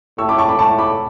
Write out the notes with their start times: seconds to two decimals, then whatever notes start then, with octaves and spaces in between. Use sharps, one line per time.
0.18 A2 C#6 E6
0.29 B5 D6
0.38 A5 C#6
0.49 B5 D6
0.59 A2 A5 C#6
0.78 B5 D6